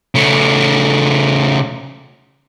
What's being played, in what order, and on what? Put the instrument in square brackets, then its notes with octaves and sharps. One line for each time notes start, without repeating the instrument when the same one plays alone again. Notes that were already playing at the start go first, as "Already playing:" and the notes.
[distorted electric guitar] C#3 A3